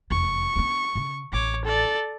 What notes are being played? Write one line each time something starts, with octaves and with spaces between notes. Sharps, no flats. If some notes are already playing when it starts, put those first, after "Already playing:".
F1 E2 C#6
B3 D4
C#3
A1 C#5 D6
A4 D5